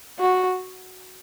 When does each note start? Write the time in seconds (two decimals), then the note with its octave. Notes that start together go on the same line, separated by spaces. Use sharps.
0.19 F#4